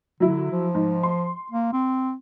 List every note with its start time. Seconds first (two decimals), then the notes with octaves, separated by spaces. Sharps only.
0.20 D3 F#3 E4
0.51 F3
0.75 G#2
1.03 C6
1.51 A#3
1.73 C4